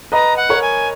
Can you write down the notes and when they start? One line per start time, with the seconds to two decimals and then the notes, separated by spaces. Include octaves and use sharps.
0.12 B4 D#5 A#5
0.37 F#5
0.49 A#4 C#5
0.62 G#5